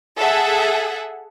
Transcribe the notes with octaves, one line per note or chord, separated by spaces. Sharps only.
G#4 A4 E5 F#5